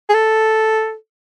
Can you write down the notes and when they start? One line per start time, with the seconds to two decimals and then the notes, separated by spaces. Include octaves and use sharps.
0.09 G#4
0.14 A4